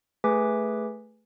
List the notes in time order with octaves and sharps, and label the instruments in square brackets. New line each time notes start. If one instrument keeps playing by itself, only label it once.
[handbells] A3 G#4 B4 G#5 D6 B6